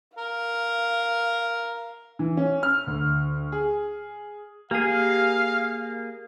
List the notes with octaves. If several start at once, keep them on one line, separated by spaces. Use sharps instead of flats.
A#4 F5
E3
C#4
F6
D2
G#4
A#3 G4 G#4 F5 G#5 G#6